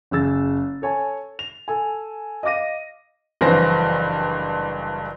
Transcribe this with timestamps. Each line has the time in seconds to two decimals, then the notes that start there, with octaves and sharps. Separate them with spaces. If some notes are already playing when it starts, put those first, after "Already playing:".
0.11 F#1 G#4 E6 A6
0.82 A4 C#5 G#5 A5
1.39 F7
1.68 A4 G#5
2.43 D#5 F5 D6 A#6 D#7
3.41 F#1 G2 E3 F3 C5 A#6